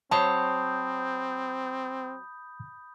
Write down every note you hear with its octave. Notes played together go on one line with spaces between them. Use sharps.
F#3 C4 C5 C#5 A5 B5 D#6 G6